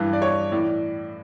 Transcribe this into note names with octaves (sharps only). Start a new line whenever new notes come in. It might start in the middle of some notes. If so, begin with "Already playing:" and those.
Already playing: G2 E3
D5
C#5
A2 E3 D5